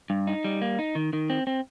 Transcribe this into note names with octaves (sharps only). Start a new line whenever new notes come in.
G2
D#4
G3
A#3
D#4
D#3
D#3
C4
C4